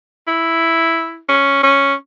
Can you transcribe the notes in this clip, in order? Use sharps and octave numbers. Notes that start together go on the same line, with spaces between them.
E4
C#4
C#4